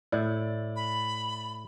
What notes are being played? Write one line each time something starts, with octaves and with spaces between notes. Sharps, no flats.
A2 E4 D5
B5